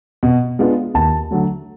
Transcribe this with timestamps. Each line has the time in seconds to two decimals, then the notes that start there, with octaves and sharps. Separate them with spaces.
0.23 B2
0.59 G#3 B3 D4 F4
0.94 D#2 A5
1.31 D3 F#3 A3